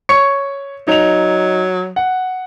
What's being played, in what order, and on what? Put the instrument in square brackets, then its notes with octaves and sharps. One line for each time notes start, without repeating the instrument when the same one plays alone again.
[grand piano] C#5 C#6 C#7
[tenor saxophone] F#3 [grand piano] D#4 F7
[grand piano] F#5